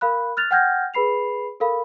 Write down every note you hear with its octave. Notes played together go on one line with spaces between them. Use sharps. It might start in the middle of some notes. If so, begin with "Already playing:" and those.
A#4 F5 B5 F#6
F6 F#6 A6 F7
F#5 G5 F6 G6 G#6 A#6
G#4 B4 B5 C7 F7
A4 A#4 F5 B5